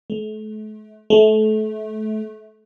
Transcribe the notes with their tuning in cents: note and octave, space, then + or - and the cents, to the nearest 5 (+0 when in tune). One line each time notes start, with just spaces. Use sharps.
A3 -40
A3 -30